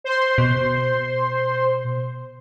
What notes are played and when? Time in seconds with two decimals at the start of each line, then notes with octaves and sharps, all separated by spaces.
0.04 C5 C6
0.38 B2